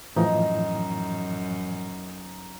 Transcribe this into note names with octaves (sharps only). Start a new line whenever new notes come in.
F#2 A2 E3 F3 D#4